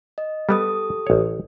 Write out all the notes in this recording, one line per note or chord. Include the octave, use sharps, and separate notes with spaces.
D#5
G3 B3 G4 A4 D#6
A1 C#5